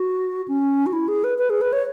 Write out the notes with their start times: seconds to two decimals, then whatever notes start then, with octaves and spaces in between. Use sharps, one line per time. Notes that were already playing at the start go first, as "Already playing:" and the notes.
Already playing: F#4
0.48 C#4
0.86 F#4
0.93 E4
1.08 G#4
1.24 B4
1.38 B4
1.50 G#4
1.61 B4
1.73 C#5